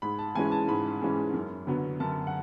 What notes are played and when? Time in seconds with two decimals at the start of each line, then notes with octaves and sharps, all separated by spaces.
0.02 G#2 B5
0.19 A5
0.35 E3 G#3 C#4 G#5
0.52 A5
0.68 G#2 B5
1.01 E3 G#3 C#4
1.34 F#2
1.67 D3 F#3 B3
2.00 F#2 A5
2.27 F#5